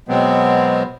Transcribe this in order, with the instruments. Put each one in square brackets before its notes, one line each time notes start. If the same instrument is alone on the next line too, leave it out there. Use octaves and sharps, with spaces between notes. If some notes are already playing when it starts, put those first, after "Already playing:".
[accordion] B2 F#3 G#3 B3 C4